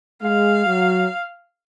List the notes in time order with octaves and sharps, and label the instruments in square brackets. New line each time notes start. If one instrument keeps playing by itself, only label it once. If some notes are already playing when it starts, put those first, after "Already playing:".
[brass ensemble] G#3 [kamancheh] F5
[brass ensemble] F#3